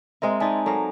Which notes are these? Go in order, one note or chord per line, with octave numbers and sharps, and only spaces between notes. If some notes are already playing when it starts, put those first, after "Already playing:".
G#3 C4 A#4 E5
D#4 D5 E5 G#5 A5
F#3 A4 A#4 F5 G#5